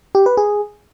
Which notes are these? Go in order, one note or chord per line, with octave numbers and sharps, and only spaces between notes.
G4
B4
G#4